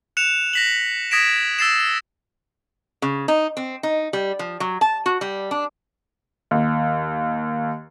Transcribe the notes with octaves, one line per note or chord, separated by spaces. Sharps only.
F#6 C#7 E7 F7
A#6 B6 F#7
D#6 G#6 A#6 B6 D7 E7
E6 A6 C7 E7
C#3
D#4
C4
D#4
G3
F3
F#3
A5
F#4
G3
D4
D#2